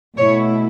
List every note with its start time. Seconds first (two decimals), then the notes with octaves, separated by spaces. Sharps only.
0.17 B2 A3 E4 C#5